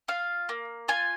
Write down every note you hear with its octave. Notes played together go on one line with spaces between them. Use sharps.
F4 F5
A#3
F4 G#5